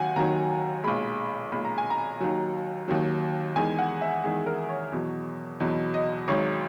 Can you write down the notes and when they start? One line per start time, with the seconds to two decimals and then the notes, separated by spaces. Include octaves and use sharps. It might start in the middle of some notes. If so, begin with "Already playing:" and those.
Already playing: D#2 D#3 F#3 F#5 G#5
0.16 D#2 D#3 F#3 A#5
0.84 B1 A#2 G#3 B5
1.52 B1 A#2 G#3 B5
1.65 A#5
1.78 G#5
1.90 A#5
2.20 D#2 D#3 F#3
2.88 D#2 D#3 F#3
3.56 E2 D#3 G#3 G#5
3.79 F#5
4.01 E5
4.24 E2 D#3 G#3 G#4
4.46 A#4
4.69 C#5
4.92 E2 B2 F#3
5.60 E2 B2 F#3 D#5
5.94 D#5
6.28 G#1 G#2 F#3 C#5